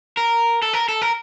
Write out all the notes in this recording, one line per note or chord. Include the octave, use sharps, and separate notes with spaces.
A#4
A4
A#4
A4
A#4